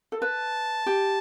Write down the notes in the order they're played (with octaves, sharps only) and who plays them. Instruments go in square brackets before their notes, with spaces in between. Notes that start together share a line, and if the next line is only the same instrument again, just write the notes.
[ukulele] A4
[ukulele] B4 [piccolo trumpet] A5
[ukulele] G4